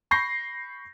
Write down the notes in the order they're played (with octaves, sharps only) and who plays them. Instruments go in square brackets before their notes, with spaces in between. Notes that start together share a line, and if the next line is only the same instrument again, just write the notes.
[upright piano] B5 C#6 G6 A#6 C7